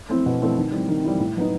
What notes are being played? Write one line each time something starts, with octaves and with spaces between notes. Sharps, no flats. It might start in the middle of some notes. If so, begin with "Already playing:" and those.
A3 C4 E4
B2
A3 C4 E4
D#3
G3 C4 E4
D#3
G3 C4 E4
A2
F#3 B3 D#4